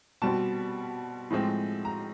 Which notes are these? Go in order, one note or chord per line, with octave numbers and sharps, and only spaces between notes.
B2 G3 C4 A5
A2 F3 G#3 C4
A#5